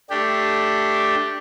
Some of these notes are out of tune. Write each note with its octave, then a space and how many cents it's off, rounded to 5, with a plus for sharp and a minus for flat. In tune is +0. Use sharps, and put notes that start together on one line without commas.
A3 +0 D4 +0 G4 +0